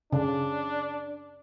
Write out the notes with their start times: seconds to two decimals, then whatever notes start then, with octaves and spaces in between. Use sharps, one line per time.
0.13 C#3 D4